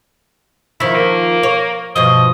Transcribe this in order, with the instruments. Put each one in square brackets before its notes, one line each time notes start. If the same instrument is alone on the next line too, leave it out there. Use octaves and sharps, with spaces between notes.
[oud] D#3 F3 [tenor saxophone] E4
[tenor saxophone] A#3
[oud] C#5
[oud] G2 B2 F3 [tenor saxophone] D#5